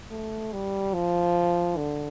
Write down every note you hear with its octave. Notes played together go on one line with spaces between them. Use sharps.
A3
G3
F3
D3